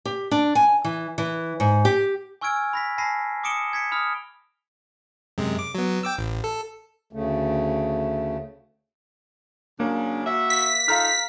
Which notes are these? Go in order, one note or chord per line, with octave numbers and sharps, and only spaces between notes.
G4
D4
G#5
E3
E3
G#2
G4
G#5 C#6 E6 F6 G#6 D7
B5 A#6 B6
G#5 A5 B5 A#6 C7 D#7
D6 D#6 C#7 D7 E7 G7
G#6 B6 C#7 D7
B5 D#6 F6
F#2 C3 G#3
D6
F#3 B3
G5 D6 E6
A1
A4
D2 C#3 A3
C#3 F#3 A#3 D4
F#4 E5
B6
D#4 F4 A4 F5 A#5 F6